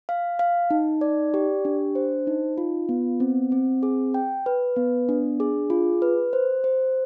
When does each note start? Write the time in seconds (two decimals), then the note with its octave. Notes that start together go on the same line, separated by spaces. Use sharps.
0.09 F5
0.39 F5
0.71 D#4
1.01 D5
1.34 G4
1.65 D4
1.95 C5
2.27 D#4
2.58 F4
2.89 B3
3.20 C4
3.52 C4
3.83 G#4
4.14 G5
4.46 B4
4.76 B3
5.09 D4
5.40 G#4
5.70 F4
6.02 B4
6.33 C5
6.64 C5